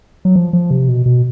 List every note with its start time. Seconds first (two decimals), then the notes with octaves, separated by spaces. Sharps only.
0.25 F#3
0.36 F3
0.53 F3
0.71 C3
0.88 B2
1.06 B2